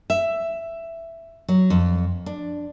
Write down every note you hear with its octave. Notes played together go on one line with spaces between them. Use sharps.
E5
F#3
F2
D4